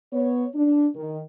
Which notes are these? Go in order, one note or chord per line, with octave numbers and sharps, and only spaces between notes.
B3 C#5
D4
D#3